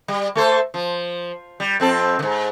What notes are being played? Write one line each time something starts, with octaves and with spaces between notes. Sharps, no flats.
G3
A3 A4 C5
F3
G3
F2 C4 A4
G#2 D3